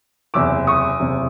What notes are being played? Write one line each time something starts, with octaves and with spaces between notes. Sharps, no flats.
F#1 E2 C3 D6 E6
C#6 D#6
F#1 E2 C3